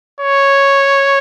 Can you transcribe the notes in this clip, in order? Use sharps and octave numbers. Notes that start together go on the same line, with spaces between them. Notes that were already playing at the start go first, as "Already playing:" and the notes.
C#5